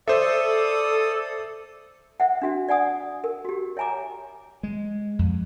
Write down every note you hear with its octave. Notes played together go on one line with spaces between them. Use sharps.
A4 C5 D5 E5 D#6
C5 E5 F#5
D4 F#4 E5
D5 F#5 G#5 D#6
A#4
F#4 G4
C#5 E5 G#5 A#5 D6
G#3
F2